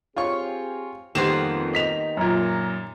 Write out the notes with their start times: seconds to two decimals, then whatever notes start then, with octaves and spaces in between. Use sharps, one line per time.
0.16 C4 F4 G4 G#4 C#5 C#6
1.15 F2 D#3 G3 A#3 B3 C5 E7
1.73 D#4 B6 F7
2.17 F#2 A#2 A#5